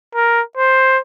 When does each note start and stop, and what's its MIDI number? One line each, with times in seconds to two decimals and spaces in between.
0.15 0.41 70
0.58 0.98 72